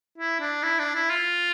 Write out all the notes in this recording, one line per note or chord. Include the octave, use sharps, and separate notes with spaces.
E4
D4
E4
D4
E4
F4